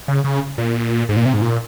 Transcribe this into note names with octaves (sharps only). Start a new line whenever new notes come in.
C#3
C#3
A#2
G#2
A#2
C3
G#2
A#2